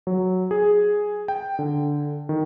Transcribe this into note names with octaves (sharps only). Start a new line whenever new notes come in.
F#3
G#4
G5
D3
D#3